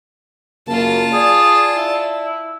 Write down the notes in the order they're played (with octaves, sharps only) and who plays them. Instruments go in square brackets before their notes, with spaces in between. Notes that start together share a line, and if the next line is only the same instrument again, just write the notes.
[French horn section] F#2 C#3 A#3 [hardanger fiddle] F4 A5
[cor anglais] G#4 [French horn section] D5
[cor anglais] E4